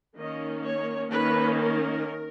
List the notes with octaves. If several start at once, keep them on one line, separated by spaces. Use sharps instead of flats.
D#3 A#3 C#4 D#5
C#5
D#3 A#3 C#4 B4
A#4